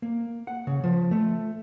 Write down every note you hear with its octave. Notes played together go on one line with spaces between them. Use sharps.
A#3
F#5
C#3
F3
A3